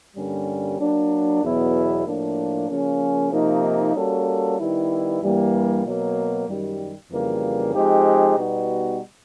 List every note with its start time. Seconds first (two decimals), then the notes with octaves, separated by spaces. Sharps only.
0.16 G2 D3 G3 A#3 C#4
0.79 F#3 A#3 D4
1.42 E2 B2 F#3 B3 E4
2.05 A2 F3 A#3 D4
2.69 C#3 F3 A#3 C#4
3.32 C3 F3 A#3 D#4
3.95 G3 A#3 C#4 F#4 A4
4.58 D#3 G3 B3 E4
5.21 G2 E3 G3 A#3
5.84 B2 F#3 A#3
6.47 F#2 D#3 G3
7.10 F2 C#3 E3 G3 A#3
7.73 F3 G#3 C4 D#4 G4
8.37 B2 G3 B3 D#4 F#4